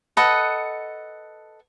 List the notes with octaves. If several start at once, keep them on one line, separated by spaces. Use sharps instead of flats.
A4 B4 D#5 F#5